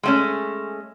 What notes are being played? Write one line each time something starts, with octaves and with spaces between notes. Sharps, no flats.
G#3 A3 C#4